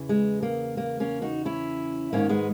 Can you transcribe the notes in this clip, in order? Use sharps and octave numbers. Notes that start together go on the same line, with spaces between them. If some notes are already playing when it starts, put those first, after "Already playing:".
Already playing: E2 C#3 E3
G#3
A#3
A#3
A#3 C#4
D#4 F#4
C#4 E4
G#2 D#3 A#3 C#4
G#3 B3